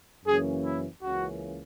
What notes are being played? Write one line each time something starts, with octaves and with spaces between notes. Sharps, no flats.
F#2 C#3 E3 A#3 C#4 G#4
E4
C#2 C#3 E3 A#3 C#4 F#4